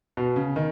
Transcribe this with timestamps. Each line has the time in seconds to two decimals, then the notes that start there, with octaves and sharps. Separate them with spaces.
0.17 B2
0.36 C#3
0.56 D#3